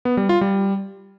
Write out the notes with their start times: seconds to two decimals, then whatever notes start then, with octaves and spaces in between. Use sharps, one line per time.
0.05 B3
0.17 G3
0.29 F4
0.41 G3